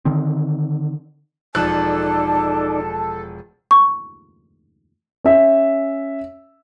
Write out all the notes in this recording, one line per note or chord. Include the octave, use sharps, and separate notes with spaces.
D3 D#3 C4
E1 F3 D#4 A4 D5 A5 F#6
C#6
C#4 E5